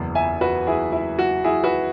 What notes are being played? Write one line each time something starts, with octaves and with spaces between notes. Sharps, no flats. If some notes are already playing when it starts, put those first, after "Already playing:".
Already playing: F#1 E2 E3
E5 G#5
F#4 B4
E4 G#4
E4
F#4
E4 G#4
F#4 B4